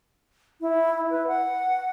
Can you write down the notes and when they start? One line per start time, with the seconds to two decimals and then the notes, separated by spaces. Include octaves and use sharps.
0.61 E4
1.10 B4
1.27 F#5